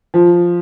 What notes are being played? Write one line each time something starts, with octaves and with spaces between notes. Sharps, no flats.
F3